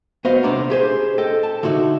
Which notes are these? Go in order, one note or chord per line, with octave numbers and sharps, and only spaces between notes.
B3 F#4 C5 D#5 F5
D#2 C3 D4 D5 A#5
G4 G#4 C5
A4 D#5 G5
A5
D3 D#4 F#4 E5